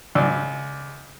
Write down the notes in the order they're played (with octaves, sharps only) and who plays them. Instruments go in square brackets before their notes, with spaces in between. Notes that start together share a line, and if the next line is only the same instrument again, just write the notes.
[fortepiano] C#2 D5 E6